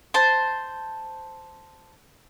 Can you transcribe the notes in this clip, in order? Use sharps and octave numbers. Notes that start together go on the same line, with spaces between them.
C5 A5